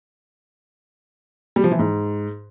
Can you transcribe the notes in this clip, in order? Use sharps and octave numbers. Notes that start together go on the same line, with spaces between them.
G3
F3
E3
G#2